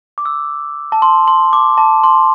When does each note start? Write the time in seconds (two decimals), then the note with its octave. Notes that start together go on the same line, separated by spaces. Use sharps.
0.18 D6
0.26 E6
0.92 A5
1.02 C6
1.28 C6
1.53 D6
1.78 A5
2.04 C6